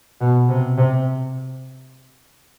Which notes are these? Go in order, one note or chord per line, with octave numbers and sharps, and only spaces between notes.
B2
C3
C3